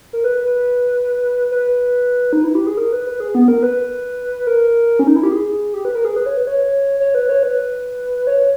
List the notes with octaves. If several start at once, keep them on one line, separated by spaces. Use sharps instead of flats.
A#4
B4
B4
D#4
E4
G4
G#4
A#4
B4
B4
G#4
B3
A#4
B4
A#4
C#4
D#4
E4
G4
G#4
G4
B4
A#4
G#4
B4
C#5
B4
C#5
C#5
B4
C#5
B4
C#5